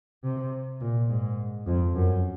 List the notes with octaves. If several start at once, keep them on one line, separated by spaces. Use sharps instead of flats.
C3
A#2
G#2
F2
F#2